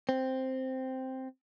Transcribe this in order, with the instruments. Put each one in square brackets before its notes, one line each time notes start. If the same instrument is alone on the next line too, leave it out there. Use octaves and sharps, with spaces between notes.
[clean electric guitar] C4